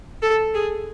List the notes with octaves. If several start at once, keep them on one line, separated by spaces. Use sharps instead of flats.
A4
G#4